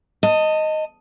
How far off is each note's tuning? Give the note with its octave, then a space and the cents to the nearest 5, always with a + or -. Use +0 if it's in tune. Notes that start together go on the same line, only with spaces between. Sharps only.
D#5 +0 A5 +30